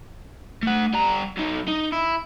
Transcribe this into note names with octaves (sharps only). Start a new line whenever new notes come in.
A3 F#5
G3 A#5
F#3 D#4
D#4
E4